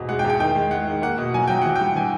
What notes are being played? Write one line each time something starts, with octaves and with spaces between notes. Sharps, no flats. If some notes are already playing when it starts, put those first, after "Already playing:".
Already playing: G#1 E2 B2
G#3 F#5
G5
E2
G5
D#3 G5
G#3
G#3 F#5
D#3
A#3 F#5
B2
F#3 G#5
F#3 G5
E3 F#5
G5
G2
E3 G#5